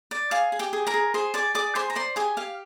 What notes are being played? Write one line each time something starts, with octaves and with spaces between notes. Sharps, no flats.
D5
G#4 F5
G#4
G4 G5
G#4
A#4 A#5
G#4
G#4 C5 C6
G#4 D5 D6
G#4 D5 D6
G#4 C5 C6
A#5
C5 D5 C6
G4 G#4 G#5
G4 F5